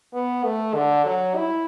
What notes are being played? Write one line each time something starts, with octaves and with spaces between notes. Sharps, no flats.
B3
A3
D3
F#3
E4